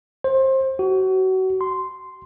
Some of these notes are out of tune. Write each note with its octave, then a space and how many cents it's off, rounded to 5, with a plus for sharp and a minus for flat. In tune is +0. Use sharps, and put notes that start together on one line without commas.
C5 +25
F#4 +30
C6 -5